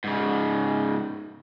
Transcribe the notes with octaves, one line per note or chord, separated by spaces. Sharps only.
G#2 C#3